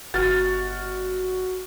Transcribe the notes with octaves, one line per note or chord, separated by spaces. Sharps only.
G1 F#4 F6 A6